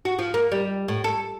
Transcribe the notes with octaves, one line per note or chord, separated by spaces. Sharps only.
F#4
F3
A#3
G3
A2
A4